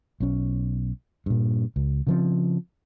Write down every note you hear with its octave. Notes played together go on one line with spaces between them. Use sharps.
B1 C#4
G2 A#2
C#2
C#3 F3 C4